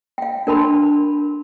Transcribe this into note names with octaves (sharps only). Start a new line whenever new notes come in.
F5 G5
D4 A#4 A5 B5 C6